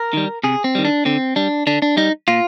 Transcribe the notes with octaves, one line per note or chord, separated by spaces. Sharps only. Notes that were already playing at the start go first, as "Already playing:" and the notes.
Already playing: A#4
D#3 G3
C3 G#4
C4
D#3 G3
D4
D3 C4
G3 D4
D3 D4
D4
G3 D#4
A#2 F4